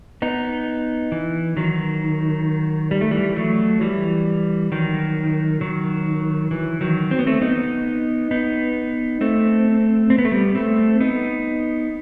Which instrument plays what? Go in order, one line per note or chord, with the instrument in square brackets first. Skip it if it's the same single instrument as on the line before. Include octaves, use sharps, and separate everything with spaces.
[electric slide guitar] B3 D#4
E3
D#3 F#3
G3
A3
E3 G3
F#3 A3
E3 G3
D#3 F#3
D#3 F#3
E3
D#3 F#3
C4
B3
A3 C4
B3 D#4
B3 D#4
A3 C4
C4
B3
A3
G3 B3
A3 C4
B3 D#4